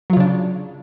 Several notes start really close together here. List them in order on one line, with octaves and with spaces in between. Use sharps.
F#3 F4 C#3 D4